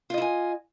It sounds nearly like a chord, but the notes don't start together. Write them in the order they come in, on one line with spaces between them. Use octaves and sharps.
F4 D#5 E4 G#5